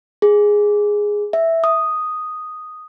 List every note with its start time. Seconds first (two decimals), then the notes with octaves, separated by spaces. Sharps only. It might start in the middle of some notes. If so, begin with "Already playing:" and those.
0.22 G#4
1.33 E5
1.64 D#6